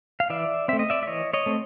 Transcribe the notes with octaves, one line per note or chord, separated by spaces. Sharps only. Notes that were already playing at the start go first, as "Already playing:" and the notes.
F5
E3 D5 E5
A3 C4 E5
D#5
D5 E5
E5
E3 C#5 D#5
C#5 D#5
A3 C4